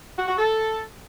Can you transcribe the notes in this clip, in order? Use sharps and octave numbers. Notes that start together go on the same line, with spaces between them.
F#4
F#4
A4